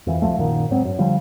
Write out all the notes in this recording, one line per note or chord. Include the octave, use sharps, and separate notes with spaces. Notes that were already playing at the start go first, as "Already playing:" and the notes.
F2 E3
C2 F3 A3
A#1 F#2 A#2 D#3
G#2 F#3 B3 C4
F#2
D3 F3 G3